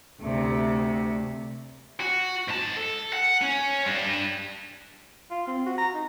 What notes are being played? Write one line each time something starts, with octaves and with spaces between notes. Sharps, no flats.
D2 C3
F#4
G#2 A5
A4
F#5
C#4
G2 D4
F4
C4
F#4
A#5
D#4